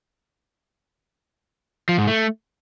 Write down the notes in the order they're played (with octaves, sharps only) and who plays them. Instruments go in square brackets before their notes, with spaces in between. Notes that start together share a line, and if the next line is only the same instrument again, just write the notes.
[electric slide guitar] F3
G#2
A3